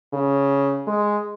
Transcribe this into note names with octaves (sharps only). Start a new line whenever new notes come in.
C#3
G#3